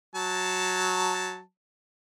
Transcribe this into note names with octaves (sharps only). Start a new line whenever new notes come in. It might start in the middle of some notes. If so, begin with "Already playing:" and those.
F#3 A5